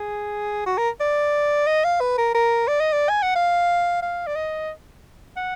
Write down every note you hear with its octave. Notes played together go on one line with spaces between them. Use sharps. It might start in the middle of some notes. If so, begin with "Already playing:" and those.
Already playing: G#4
F#4
A#4
D5
D#5
F5
B4
A#4
A#4
D5
D#5
D5
G#5
F#5
F5
F5
D5
D#5
F#5